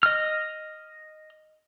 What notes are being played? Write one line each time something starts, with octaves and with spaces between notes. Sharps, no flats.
D#5 F6